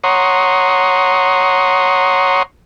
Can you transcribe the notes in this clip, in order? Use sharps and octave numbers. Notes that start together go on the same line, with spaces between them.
C#5 F#5 A#5 C6 C#6 D#6